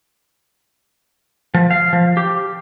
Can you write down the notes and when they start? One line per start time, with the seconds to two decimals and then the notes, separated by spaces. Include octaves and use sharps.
1.54 F3
1.71 F5
1.93 F3
2.17 G4